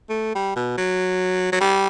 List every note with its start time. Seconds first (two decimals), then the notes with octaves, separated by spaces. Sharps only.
0.09 A3
0.35 G3
0.56 B2
0.77 F#3
1.52 F#3
1.60 G3